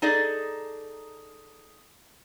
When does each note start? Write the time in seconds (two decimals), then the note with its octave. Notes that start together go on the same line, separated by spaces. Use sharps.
0.02 D#4 G#4 A4 D5 D#5